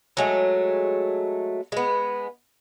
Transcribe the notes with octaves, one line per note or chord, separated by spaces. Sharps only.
F#3 G#3 A3
G#3 B3